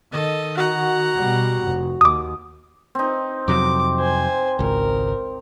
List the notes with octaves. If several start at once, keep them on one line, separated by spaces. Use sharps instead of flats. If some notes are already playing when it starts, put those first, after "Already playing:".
D#3 A4 D#5
F#4 F#5 A#5
B2 G3
F1
D#2 D6 D#6
C4 D#4
F2 C3 F#3 D6
C5 G#5
G#1 C#2 A#4